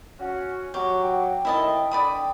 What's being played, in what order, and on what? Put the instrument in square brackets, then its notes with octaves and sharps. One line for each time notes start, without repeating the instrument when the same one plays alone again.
[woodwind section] C#4 F#4
[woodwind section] F#3 [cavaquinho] G4 [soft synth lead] C#6
[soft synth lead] G5
[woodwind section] A2 C3 D#3 [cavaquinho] E4 D#5 A5
[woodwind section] D3 [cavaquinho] D5 B5 D#6